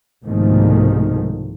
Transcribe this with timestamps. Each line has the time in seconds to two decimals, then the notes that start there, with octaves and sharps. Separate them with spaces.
0.25 C2 G#2 B2 D#3 F3 A3